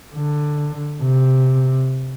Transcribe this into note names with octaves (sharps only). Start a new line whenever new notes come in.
D3
C3